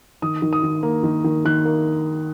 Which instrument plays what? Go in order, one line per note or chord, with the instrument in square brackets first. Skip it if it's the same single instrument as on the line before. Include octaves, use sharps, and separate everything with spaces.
[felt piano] D#3 D#6
D#3
D#6
D#3
A#3
D#3
D#3
D#3 F#6
A#3